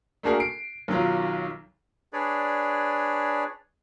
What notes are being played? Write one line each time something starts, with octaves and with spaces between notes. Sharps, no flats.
A3 A#3 D4 F#4 G#4 A#4
C7 D7
B1 D#3 F#3 F4
D4 G#4 B4 C#5 D5